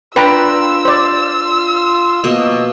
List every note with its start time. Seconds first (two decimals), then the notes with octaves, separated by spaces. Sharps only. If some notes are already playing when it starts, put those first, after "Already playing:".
0.16 D4 F4 B4 G5 A#5 E6
0.85 C5 D5
2.24 B2 F3 A#3 D#5